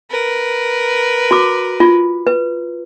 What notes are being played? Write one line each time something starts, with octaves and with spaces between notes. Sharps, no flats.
A#4 B4
F#4 D6
F4
B4